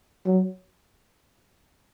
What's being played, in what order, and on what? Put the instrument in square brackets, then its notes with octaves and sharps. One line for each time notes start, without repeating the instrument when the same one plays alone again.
[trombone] F#3